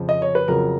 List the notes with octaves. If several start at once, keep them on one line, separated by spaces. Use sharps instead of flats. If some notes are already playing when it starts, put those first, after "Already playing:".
Already playing: F2 C#3 F3
D#5
C#5
B4
F2 C#3 F#3 A#4